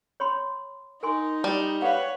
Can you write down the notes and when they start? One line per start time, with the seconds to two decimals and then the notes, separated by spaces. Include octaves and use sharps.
0.20 C#5 B5 C6
1.03 D#4 A#4 G#5 C6
1.44 G3
1.82 B4 C#5 F5 F#5